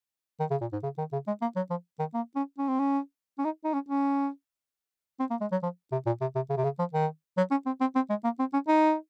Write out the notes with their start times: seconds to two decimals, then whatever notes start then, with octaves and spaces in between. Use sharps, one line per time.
0.40 D#3
0.51 C#3
0.61 A#2
0.73 G#2
0.83 C#3
0.98 D#3
1.13 C#3
1.27 G#3
1.42 A#3
1.56 F#3
1.70 F3
1.99 D#3
2.14 A#3
2.36 C#4
2.58 C#4
2.68 C4
2.79 C#4
3.39 C#4
3.45 D#4
3.64 D#4
3.74 C#4
3.89 C#4
5.20 C4
5.30 A#3
5.41 G#3
5.52 F#3
5.63 F3
5.92 C3
6.06 A#2
6.21 C3
6.35 C3
6.50 C#3
6.57 C3
6.64 C#3
6.79 F3
6.93 D#3
7.37 F#3
7.51 C#4
7.66 C4
7.81 C4
7.95 C4
8.10 G#3
8.24 A#3
8.39 C4
8.53 C#4
8.68 D#4